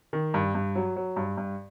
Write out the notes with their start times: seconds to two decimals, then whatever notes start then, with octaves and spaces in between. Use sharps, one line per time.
0.13 D#3
0.34 G2
0.55 G2
0.76 F#3
0.96 F#3
1.16 G2
1.37 G2